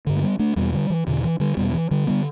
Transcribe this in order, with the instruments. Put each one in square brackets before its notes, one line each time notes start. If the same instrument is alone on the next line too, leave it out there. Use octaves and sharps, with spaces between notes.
[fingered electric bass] G2 D3
A3
G3 B3
A3 D4
E2 B2 G3 B3
D3 G3
E3
E2 B2 D3
E3
D3 G3
E2 B2 G3 B3
E3
D3 G3
D3 G3 B3